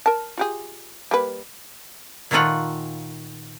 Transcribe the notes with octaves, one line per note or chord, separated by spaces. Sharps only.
A#4 A5
F4 G4 G#4
G3 A#3 B4
A#2 D#3 A3 D#4 F4 F#5